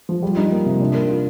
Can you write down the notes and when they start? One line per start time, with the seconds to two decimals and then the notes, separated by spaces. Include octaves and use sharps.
0.09 F3
0.22 G3
0.37 D#4
0.52 A#3
0.66 C3
0.81 D4
0.94 A#4
1.09 F4